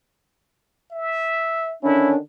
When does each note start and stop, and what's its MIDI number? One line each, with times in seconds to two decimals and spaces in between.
0.91 1.75 76
1.83 2.17 50
1.83 2.17 51
1.83 2.15 61
1.83 2.17 62
1.83 2.10 64